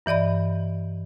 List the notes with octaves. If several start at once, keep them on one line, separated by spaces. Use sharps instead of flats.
G2 E3 D5 D#5 B5